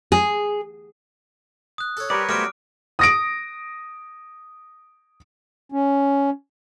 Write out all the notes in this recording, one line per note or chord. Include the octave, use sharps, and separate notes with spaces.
G#4
D#6 F#6
A4 C#5
G3 G4 A#4 B4 C#5 D5
F#3 G3 A3 B3 C5 D6 F6 D7
D#6 A#6 D7
C#4